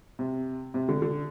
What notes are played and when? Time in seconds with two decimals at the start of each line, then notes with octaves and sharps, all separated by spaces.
0.19 C3
0.74 C3
0.89 D3
1.02 D3